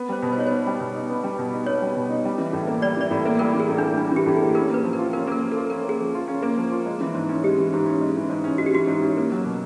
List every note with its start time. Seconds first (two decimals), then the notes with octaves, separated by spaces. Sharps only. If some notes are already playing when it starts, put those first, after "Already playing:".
Already playing: B3
0.09 G3 C5
0.22 B2
0.33 C5
0.37 D#4 C#5
0.47 B3 C5
0.66 G3
0.80 B2
0.94 D#4
1.10 B3
1.23 G3
1.38 B2
1.53 D#4
1.66 B3 C#5
1.82 G3
1.96 B2
2.10 D#4
2.25 G3
2.38 E3
2.53 A2
2.67 A#3
2.82 G3 D5
2.97 E3 D5
3.11 A2
3.25 A#3
3.39 G3 A#4
3.54 E3
3.60 G#4
3.68 A2
3.78 A#3 D4
3.97 G3 D4
4.12 E3 G4
4.26 A2
4.36 A#3 G#4
4.55 C#4 A#4
4.70 A#3 B4
4.84 F3
4.93 A#4
4.98 F4
5.13 C#4 A#4
5.27 A#3 A#4
5.42 F3
5.52 F4 A4
5.70 C#4 A#4
5.85 A#3 G#4
6.00 F3
6.14 F4
6.28 C#4
6.42 A#3
6.57 F3
6.71 F4
6.85 G#3
7.01 E3
7.14 G#2
7.29 C#4
7.43 G#3 G4
7.58 E3
7.73 G#2
7.86 C#4
8.01 G#3
8.16 E3
8.29 G#2
8.44 C#4
8.58 G#3 F#4
8.66 G4
8.74 E3 F#4
8.87 G#2
9.02 C#4
9.17 A#3
9.31 F#3
9.45 B2